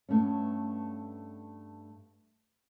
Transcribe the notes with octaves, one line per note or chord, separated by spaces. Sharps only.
G2 A#2 A3 B3 C#4